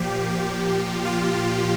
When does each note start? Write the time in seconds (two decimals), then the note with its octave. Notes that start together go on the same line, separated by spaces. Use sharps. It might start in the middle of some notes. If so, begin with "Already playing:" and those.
Already playing: A#2 F3 G4
1.05 F4